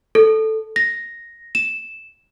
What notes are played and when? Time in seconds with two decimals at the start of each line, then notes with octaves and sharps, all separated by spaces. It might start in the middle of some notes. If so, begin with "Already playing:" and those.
0.15 A4
0.76 A#6
1.55 E7